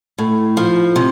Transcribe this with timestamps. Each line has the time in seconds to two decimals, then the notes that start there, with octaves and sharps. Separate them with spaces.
0.18 A2
0.57 F3
0.96 C3